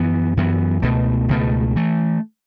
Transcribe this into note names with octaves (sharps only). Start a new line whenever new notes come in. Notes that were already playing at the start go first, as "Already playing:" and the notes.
Already playing: F#2 E3 B3
F#2 E3 B3
C#2 B2 A3
C#2 B2 A3
E3 A3